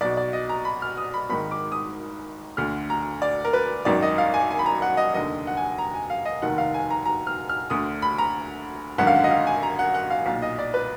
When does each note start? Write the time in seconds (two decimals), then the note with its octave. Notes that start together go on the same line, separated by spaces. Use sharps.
0.01 B1 B2 D5
0.17 D5
0.33 D#5
0.49 A#5
0.65 B5
0.82 F6
0.97 D#6
1.14 B5
1.30 G#1 G#2 D#3 B5
1.51 D6
1.72 D#6
2.57 D2 D3 F6
2.90 A#5
3.22 D5
3.45 A#4
3.53 B4
3.85 G#1 F#2 D#3 D5
4.02 D#5
4.18 F5
4.34 G#5
4.50 G#5
4.59 B5
4.66 A#5
4.82 F#5
4.97 D#5
5.14 F1 D#2 D3 D#5
5.47 F#5
5.57 G#5
5.78 A#5
5.94 G#5
6.10 F5
6.25 D#5
6.42 F1 D#2 D#3 F#5
6.58 F5
6.74 G#5
6.90 A#5
7.05 A#5
7.27 F6
7.49 F6
7.70 D2 D3 D#6
8.02 B5
8.18 A#5
8.98 G#1 F#2 D3 F#5
9.07 F5
9.15 F#5
9.24 D#5
9.31 F5
9.47 G#5
9.63 A#5
9.79 F#5
9.94 F#5
10.10 F5
10.26 B1 A#2 F5
10.42 D#5
10.59 D5
10.74 B4